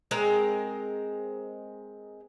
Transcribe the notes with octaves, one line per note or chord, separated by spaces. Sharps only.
G#3 C4 A#4